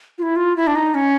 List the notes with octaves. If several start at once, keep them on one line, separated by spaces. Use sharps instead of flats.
F4
E4
F4
E4
D4
D#4
C#4